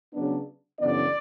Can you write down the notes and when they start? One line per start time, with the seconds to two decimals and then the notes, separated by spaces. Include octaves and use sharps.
0.13 C#3 F#3 B3 D4
0.80 F#2 C#3 E3 B3 D4 D5